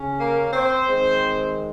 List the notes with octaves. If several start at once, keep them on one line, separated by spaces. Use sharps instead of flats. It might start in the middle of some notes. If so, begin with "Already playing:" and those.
Already playing: C#3 C#4
A#3 A#4
C4 C5
D#3 G#3 C4